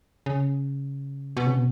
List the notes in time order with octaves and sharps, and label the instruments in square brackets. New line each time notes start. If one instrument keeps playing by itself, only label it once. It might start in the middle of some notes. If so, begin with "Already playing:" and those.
[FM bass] C#3
B2
C#3
B2